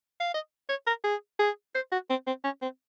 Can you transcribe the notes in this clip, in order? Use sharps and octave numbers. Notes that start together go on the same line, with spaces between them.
F5
D#5
C#5
A#4
G#4
G#4
C5
F#4
C4
C4
C#4
C4